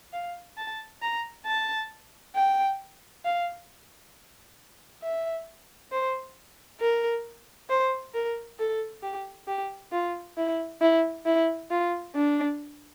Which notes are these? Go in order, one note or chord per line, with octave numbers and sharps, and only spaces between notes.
F5
A5
A#5
A5
G5
F5
E5
C5
A#4
C5
A#4
A4
G4
G4
F4
E4
E4
E4
F4
D4